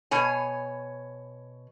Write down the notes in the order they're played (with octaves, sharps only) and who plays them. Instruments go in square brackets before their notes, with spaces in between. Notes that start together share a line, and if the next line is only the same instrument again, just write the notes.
[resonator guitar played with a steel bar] B2 C#5 G#5